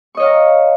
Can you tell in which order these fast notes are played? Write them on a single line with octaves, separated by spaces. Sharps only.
C#6 D#5 C#5 F5 A#5